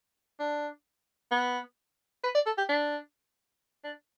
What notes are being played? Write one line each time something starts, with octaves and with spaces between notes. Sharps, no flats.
D4
B3
B4
D5
A4
G4
D4
D4